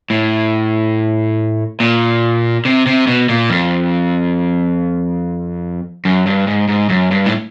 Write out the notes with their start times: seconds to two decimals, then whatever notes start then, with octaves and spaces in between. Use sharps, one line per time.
0.10 A2
1.80 A#2
2.65 C3
2.86 C3
3.07 B2
3.29 A#2
3.50 F2
6.05 F#2
6.27 G2
6.47 G#2
6.69 G#2
6.90 F#2
7.11 G2
7.26 A2